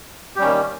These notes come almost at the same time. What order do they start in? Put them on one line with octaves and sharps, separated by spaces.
G4 G3 C#4 D#3 A#3